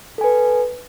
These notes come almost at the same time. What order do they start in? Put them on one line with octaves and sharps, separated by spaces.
A4 G#5 B4